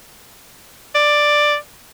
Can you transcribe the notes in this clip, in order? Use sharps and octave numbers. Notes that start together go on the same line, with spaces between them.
D5